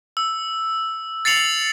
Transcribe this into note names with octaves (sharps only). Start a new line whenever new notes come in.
E6
A6 C7 C#7 F7 F#7